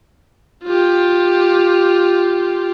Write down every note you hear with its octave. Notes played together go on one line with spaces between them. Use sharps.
F4 G4